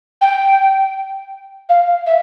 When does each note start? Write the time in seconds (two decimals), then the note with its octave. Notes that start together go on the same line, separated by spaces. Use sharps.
0.21 G5
1.69 F5
2.06 E5